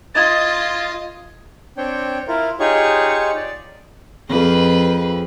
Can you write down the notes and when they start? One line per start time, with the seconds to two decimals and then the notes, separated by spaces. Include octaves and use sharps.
0.14 F4 D#5 G#6 A6
1.77 C4 D4 C#5 G5
2.28 E4 F4 A#4
2.60 D#4 F4 G4 G#4 C#5 C#6
3.36 D5
4.29 F2 G#4 B4